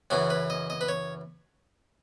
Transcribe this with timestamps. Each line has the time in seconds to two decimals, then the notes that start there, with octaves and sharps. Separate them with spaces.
0.10 F#2 C#3 E3 F#4
0.30 B4
0.50 D#5
0.70 D#5
0.81 B4
0.88 C#5